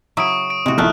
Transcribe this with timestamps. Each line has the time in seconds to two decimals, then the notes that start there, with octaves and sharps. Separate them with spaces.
0.17 C#3 F#3 E4 C#6 D#6 D7
0.50 D7
0.66 A2 C3 G#3 F#4
0.78 A#1 D#3 A3 E4 F6 F#6